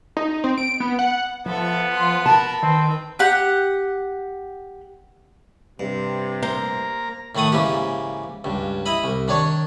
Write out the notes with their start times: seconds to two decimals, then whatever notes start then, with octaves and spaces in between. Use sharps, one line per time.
0.17 D#4
0.44 C4
0.58 D7
0.80 B3
0.99 F#5
1.46 F3 B3 A4 E5
1.89 F4 C6
2.26 A#4 A5 B5
2.63 D#3 C4 B4 G5
3.19 G4 F#5
5.80 G2 C3
6.43 A#3 C5 A#5
7.35 A2 D#3 A3 F#5 D#6
7.52 G#2 C#3 E3 A#3 G4
8.44 C#2 G2
8.86 E4 D#5 B5
9.04 C2
9.28 D#3 D4 C#5